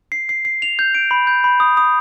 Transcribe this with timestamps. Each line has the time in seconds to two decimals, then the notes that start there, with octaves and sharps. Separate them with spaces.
0.12 C7
0.29 C7
0.45 C7
0.62 F7
0.79 G6
0.95 D7
1.11 B5
1.27 G6
1.44 B5
1.60 D#6
1.77 D#6